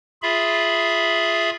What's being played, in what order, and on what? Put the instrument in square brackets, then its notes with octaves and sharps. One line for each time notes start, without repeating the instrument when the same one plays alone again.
[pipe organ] F4 G#4 E5 B5